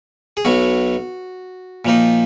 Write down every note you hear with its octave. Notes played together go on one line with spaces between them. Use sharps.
G#4
B1 B2 F#3 F#4
A#2 F3 A#3 D#4